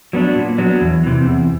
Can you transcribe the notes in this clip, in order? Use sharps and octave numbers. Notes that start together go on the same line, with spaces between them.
F#3 B3 D4
A#2
F#3 B3 D4
E2
C3 E3
E2